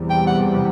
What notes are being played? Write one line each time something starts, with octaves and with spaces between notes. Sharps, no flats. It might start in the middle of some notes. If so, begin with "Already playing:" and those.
Already playing: E2 C3 G3
G5
F#5